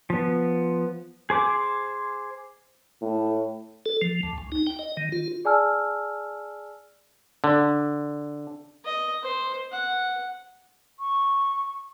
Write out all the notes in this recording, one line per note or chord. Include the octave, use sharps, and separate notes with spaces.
F3 B3
G#4 C5 D6
A2
A4
F3
D2
C#2
D#4
G5
D#5
D#3
F4
G#4 D5 G#5 A5 E6 F6
D3
D#5
C5
F#5
C#6